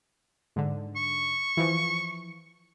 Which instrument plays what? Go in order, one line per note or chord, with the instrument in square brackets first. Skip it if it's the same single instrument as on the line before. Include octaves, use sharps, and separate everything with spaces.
[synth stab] G#2 D3
[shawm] C#6
[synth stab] E3 F3